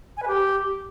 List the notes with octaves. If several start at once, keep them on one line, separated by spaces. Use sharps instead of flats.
G#5
B4
G4